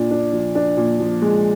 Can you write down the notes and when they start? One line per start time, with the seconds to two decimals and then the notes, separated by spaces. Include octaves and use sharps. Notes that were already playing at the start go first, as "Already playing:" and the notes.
Already playing: A#2 D4
0.11 D4
0.33 F3
0.55 D4
0.77 A#2
1.00 F3
1.22 G#3